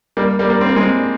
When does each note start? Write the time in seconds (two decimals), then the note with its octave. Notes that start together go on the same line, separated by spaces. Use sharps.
0.17 G3 A#3
0.39 G3 A#3
0.50 G3 A#3
0.61 C4
0.69 A#3
0.76 G#3 C4